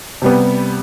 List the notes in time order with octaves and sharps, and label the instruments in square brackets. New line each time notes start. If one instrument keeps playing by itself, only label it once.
[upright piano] C3 G3 B3